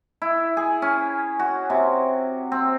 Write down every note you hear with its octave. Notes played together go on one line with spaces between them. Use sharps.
E4
G#4
C#4
F#4
C3
C4